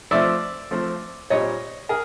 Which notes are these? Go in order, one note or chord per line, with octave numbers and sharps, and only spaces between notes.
F3 A3 C4 D5 E5
F3 A3 C4
A#2 G3 C4 C#5 D#5
G#4 A#4